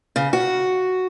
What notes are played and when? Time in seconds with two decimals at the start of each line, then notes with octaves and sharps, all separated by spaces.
0.16 C#3
0.33 F#4